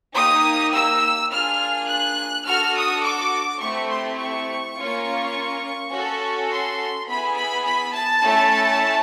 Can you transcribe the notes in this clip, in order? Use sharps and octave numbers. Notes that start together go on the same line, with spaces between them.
A#3 D#4 G4 D#6
E6
A#3 D4 F4 G#4 F6
F#6
D4 F#4 A4 F6
D#6
D6
A3 C4 E4 G4 C#6
C6
C#6
A#3 C#4 F4
C#4 F#4 A4
C6
B3 E4 G#4 B5
B5
B5
A5
A3 C#4 E4 A4